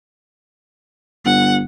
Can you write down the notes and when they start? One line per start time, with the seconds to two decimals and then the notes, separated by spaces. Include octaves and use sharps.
1.25 G1 F#5